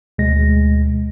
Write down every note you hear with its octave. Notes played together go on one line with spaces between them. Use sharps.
D2 B2 G#3 A#6